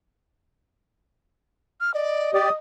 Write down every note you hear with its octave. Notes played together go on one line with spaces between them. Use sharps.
F6
D5 D#5
G4 D5 D#6